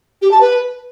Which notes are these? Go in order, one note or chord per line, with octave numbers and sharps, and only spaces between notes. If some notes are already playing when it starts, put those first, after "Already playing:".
G4
A5
B4